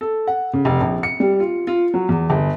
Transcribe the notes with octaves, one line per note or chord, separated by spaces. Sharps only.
A4
F#5
C#3
F1
A#1
C#7
G3
F4
F4
F#3
E2
G1